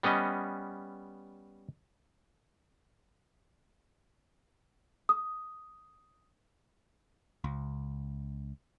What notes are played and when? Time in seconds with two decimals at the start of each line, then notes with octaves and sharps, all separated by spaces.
0.03 G3 B3 C#4 D#5
5.09 D#6
7.44 C#2